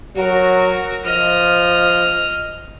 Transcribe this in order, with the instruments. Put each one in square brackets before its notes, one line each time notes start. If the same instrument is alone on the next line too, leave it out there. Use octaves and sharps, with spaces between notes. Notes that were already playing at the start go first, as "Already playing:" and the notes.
[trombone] F#3 [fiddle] F#4 A#4
[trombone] F3 [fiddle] D#5 F6